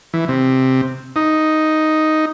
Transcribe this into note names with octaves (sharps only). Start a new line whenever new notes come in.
E3
C3
D#4